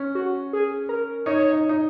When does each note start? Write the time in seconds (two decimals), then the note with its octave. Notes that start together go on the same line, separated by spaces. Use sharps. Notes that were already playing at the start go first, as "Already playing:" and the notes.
Already playing: C#4
0.15 F#4
0.53 G#4
0.89 A#4
1.26 D#4 C#5
1.52 D#4
1.69 D#4